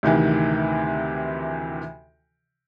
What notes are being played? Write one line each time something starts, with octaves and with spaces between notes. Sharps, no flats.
D2 C3 D#3 E3